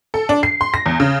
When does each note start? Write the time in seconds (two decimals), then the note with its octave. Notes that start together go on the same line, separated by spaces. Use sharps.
0.14 A4
0.29 D4
0.43 C7
0.61 C6
0.74 A#6
0.86 E2
1.00 C#3